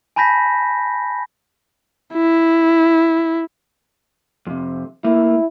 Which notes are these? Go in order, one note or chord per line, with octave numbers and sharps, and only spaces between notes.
G#5 A5 B5 G6 A#6 B6
E4
F2 C3
A3 A#3 E4